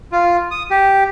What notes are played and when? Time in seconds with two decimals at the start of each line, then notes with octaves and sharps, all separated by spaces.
0.12 F4
0.51 D#6
0.71 G4